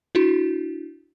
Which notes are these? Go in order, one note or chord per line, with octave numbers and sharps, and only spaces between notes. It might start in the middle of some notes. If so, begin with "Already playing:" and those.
D4 E4 F#4